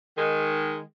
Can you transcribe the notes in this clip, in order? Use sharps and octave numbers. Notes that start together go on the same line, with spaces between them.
D#3 G#3